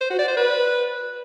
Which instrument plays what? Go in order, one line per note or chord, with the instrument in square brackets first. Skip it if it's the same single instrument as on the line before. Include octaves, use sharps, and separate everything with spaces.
[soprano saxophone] C5
F#4
D5
C5
B4